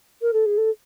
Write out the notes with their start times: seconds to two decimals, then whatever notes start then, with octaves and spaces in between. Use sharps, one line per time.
0.22 A#4
0.33 A4
0.46 G#4
0.58 A4